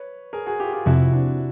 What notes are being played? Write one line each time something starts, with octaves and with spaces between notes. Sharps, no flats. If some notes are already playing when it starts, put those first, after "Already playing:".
Already playing: B4 C#5
G#4 A#4
F#4 G#4
F4 G4
F4 G4
F2 C3 F3 E4 F#4
D4 E4